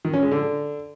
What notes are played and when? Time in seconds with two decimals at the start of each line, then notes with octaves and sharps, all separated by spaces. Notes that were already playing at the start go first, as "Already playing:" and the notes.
0.05 D#3
0.14 C#4
0.23 G#3
0.32 D3